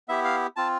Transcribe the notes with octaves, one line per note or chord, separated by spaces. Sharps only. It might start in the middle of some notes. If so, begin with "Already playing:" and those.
B3 E4 G4 E5
F5
C4 F4 A5